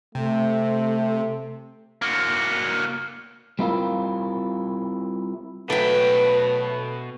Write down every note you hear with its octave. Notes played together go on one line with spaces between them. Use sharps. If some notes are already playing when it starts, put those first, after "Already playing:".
C3 A3
A#3 F#4
G3 C4 E4 F4 A#4
B2 F#3 A3 B4 G5